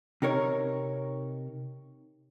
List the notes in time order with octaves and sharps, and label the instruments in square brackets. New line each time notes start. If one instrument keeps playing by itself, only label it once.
[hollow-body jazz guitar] C3 D#4 A#4 C#5